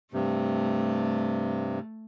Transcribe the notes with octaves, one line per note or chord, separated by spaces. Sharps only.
G2 C3 A3